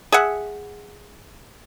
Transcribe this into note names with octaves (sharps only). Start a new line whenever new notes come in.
G#4 E5 F#5